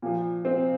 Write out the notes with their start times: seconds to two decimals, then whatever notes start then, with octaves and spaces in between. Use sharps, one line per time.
0.02 A#2 F3
0.45 C4